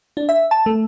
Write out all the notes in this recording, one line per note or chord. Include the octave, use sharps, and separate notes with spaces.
D4
E5
A5
A3